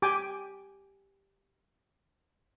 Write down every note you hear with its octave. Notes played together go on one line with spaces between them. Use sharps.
G4 G5 G#5 D6